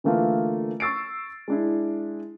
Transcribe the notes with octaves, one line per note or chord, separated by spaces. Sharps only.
D3 E3 A3 A#3 F4
C#6 E6 A6 C7 D7
G#3 D4 E4